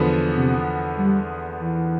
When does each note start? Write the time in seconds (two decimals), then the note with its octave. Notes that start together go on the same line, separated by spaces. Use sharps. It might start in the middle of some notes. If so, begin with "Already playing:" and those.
Already playing: E2 D3 F3 B3
0.37 C3
0.98 G3
1.60 E3